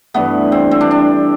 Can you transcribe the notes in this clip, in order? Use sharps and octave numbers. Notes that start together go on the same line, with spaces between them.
G2 E3 A3 B3
C4
C4
D4
D4